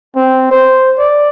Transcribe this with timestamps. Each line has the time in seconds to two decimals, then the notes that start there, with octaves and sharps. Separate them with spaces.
0.16 C4
0.51 C5
0.98 D5